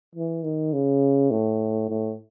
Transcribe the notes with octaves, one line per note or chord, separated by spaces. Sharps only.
E3
D#3
C#3
A2
A2